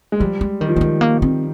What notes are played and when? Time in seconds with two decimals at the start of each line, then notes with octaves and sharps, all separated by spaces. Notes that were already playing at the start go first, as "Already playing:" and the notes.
0.12 G#3
0.20 F3 G3
0.41 G#3
0.61 D#3 G3
0.68 F3
0.76 D#3 G3
0.81 G#3
1.01 A#3
1.22 C4